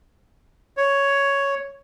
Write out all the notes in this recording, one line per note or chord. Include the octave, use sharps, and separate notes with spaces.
C#5